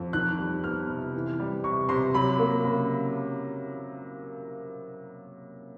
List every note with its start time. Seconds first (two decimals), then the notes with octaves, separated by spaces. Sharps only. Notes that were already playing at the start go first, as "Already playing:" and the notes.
Already playing: F2
0.13 D#3 F#6
0.39 G3
0.64 B3 F6
0.90 C3
1.14 E3
1.40 G3
1.64 C3 C#6
1.89 C3 C6
2.14 F#3 B5
2.39 A#3
2.64 C#3 B5